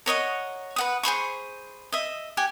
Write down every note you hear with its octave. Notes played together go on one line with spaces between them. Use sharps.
A#4 C#5 D#5 F#5
B4 F#5 D#6
G#4 C5 B5 C#6
D#5 E5
G4 F#5 G#5